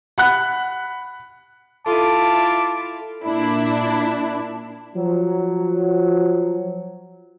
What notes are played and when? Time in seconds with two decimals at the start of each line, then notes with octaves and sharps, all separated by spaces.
0.18 F#5 B5 F#6
1.86 E4 F4 A4 A5 D6 D#7
3.24 A#2 D4 E4
4.95 F3 F#3